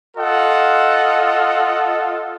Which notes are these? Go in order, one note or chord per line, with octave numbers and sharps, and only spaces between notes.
F4 A4 D#5 F#5